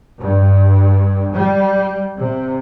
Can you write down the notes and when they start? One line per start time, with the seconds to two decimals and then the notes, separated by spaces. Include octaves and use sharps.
0.21 G2
1.36 G3
2.19 C3